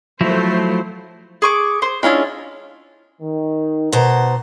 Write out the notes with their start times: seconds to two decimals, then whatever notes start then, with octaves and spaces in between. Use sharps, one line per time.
0.21 F3 F#3 A3 E4 C5
1.42 G#4 C#6 D6
1.82 C5
2.03 G#3 C#4 D4 E4 F4
3.21 D#3
3.92 B2 A#4 C5 F#5 A#5